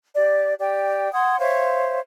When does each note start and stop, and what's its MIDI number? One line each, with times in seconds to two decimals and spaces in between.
0.15 0.54 67
0.15 0.54 74
0.59 1.11 67
0.59 1.11 74
0.59 1.11 79
1.13 1.38 78
1.13 1.38 84
1.13 1.38 87
1.13 1.38 92
1.39 1.99 72
1.39 1.99 73
1.39 1.99 76
1.39 1.99 77